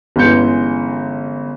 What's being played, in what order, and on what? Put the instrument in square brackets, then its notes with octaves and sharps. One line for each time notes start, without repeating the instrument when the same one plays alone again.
[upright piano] G1 E3 G#3 C#4 G6 C#7